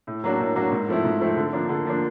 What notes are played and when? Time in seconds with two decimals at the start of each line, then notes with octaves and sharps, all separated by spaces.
0.07 A2
0.24 F#3 A#3 D4 F#4
0.40 A2
0.56 F#3 A#3 D4 F#4
0.72 G#2
0.88 F3 A3 C4 E4
1.05 G#2
1.21 F3 A3 C4 E4
1.37 D3
1.53 F3 A#3 D4
1.69 D3
1.86 F3 A#3 D4